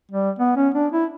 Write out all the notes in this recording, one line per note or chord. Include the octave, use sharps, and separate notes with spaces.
G3
B3
C#4
D4
E4